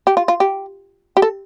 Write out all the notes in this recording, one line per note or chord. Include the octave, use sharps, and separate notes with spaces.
G4
F4
F4
G4
G4
A4